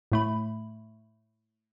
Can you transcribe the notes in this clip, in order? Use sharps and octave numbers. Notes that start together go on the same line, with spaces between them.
A2 A3 B5